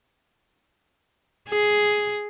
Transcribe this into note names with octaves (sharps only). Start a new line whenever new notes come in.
G#4